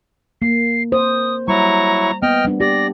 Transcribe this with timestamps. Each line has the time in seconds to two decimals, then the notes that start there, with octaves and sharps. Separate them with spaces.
0.42 A#3 C7
0.92 C5 D#6
1.48 F#3 G3 E4 A#5 C#6
2.23 A#3 B3 D#5 G5 F6
2.45 G3 D4
2.60 G4 D5 A#6